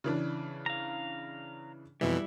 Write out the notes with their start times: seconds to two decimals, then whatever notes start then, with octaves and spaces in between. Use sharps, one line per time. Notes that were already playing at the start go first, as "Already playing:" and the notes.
0.04 C#3 E3 D4
0.66 F5 A#5
2.01 F2 B2 E3 G3 E4